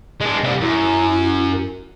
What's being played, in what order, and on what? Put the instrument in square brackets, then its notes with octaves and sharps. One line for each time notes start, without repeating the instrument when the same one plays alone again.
[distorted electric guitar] G#3 D4
C3 G3
[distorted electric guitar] F#2 [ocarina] E4